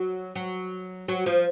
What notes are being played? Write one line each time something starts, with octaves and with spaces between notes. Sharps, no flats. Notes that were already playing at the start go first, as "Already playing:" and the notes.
Already playing: F#3
F#3
F#3
F3